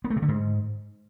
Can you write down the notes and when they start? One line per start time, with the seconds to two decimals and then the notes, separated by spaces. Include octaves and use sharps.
0.04 B3
0.10 A3
0.16 C3
0.22 D3
0.28 G#2